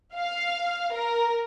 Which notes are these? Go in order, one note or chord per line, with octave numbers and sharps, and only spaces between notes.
F5
A#4